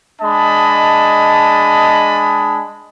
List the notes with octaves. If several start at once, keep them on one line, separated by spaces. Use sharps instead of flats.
G#3 D4 D#5 A5 B5